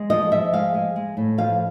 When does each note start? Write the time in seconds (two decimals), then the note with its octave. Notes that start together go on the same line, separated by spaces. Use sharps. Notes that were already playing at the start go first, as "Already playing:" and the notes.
Already playing: G#3
0.10 F3 D#5
0.31 F3 E5
0.53 G#3 F5
0.74 G#3
0.96 G#3
1.17 A2
1.38 F3 F5